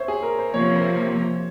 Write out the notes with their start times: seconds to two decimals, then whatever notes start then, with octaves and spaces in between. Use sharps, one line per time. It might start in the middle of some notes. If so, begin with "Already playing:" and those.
Already playing: C5 C#5 E5
0.08 G#4
0.23 A#4
0.39 C5
0.54 C3 F3 A#3 C#5
0.76 C5